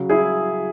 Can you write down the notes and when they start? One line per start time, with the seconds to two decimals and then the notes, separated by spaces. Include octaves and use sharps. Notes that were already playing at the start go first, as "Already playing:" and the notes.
Already playing: C#3 F#3
0.09 E4 G#4